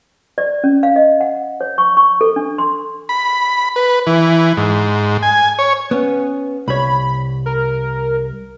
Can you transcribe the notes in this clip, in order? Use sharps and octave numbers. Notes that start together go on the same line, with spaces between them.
D5
C#4
F5
D#5
F#5
C#5
C#6
C#6
A4
D4
C6
B5
B4
E3
G#2
G#5
C#5
B3 C#4
C2 C#5 B5
A#4